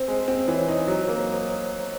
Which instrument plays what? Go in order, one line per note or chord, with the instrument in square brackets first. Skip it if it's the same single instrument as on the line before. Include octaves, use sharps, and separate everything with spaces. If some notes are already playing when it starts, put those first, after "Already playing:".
Already playing: [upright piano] C4 [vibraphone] C5
[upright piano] G#3
C4
[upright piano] E3 [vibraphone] C#5
[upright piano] D#4
F#3
A#3